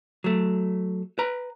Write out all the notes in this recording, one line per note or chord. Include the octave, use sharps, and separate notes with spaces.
F#3 A3
B4 A#5